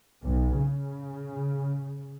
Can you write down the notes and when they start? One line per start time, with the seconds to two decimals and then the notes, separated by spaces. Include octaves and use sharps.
0.22 B1
0.62 C#3